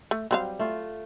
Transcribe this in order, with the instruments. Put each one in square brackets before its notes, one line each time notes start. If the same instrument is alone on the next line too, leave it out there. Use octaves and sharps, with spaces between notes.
[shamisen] A3
[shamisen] F#3 C4 F5 [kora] G3
[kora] A3 F4